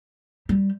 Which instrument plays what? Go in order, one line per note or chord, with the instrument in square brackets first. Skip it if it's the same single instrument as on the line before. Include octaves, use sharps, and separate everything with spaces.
[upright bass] G3